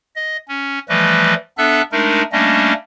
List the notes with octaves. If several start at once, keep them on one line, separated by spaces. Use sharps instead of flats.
D#5
C#4
E3 F3 G3 A3 B4 D#5
B3 D4 A4 E5 E6 F#6
G#3 A3 D4 D#4 A#4
G3 A3 A#3 C#4 D4 D#5